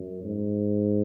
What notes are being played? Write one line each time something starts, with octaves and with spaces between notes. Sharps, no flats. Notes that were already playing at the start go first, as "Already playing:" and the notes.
Already playing: F#2
G#2